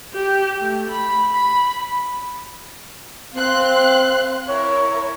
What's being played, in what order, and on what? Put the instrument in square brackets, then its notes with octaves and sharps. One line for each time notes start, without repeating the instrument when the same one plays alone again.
[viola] G4
A3
B5
B5
[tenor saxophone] C4 [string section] F5 C6 F#6
[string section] E4 A#4 [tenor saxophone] C#5